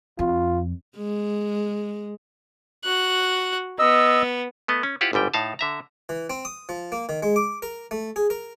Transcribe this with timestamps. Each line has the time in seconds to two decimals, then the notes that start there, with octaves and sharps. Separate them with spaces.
0.19 F2 F4
0.97 G#3
2.84 F#4 F#6
3.79 B3 D#5 E6
4.68 A3 B3 D#5
4.83 C#4
5.01 E4 F4 G4 C5 F5 F#5
5.13 G1 G#2 G3 G5
5.34 A2 D#4 F5 A5
5.59 D3 E5 A#5
6.09 E3
6.30 C4
6.45 D#6
6.69 F3
6.92 A#3
7.09 D#3
7.23 G#3
7.36 D6
7.62 A#4
7.91 A3
8.16 G#4
8.30 A#4